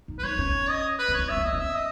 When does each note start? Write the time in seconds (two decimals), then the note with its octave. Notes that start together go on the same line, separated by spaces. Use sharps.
0.08 D#4
0.19 B4
0.24 D#4 C#5
0.38 C#4
0.69 D#5
0.99 B4
1.09 C#4
1.14 D#4 C#5
1.29 D#4 E5
1.37 C#4
1.44 B3 D#5
1.53 C#4
1.60 E5
1.74 D#5